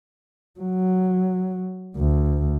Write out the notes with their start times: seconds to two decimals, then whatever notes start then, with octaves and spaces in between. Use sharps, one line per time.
0.60 F#3
1.96 D2